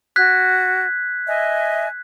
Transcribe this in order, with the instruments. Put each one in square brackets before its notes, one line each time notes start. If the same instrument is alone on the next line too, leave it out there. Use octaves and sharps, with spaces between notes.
[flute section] F#4 [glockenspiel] F#6 G#6 B6
[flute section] D#5 E5 G#5